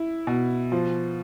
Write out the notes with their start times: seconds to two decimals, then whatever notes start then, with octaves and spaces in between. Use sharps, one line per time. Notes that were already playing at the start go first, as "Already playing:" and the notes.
Already playing: E4
0.27 B2
0.72 F3